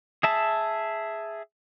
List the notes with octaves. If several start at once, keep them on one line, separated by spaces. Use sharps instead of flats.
G#4 E5 A5